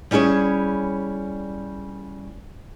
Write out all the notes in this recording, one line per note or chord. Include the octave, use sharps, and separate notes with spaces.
G3 C#4 E4 G#4 C#5